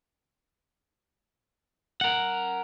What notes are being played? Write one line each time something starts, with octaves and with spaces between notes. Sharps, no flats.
A#4 F#5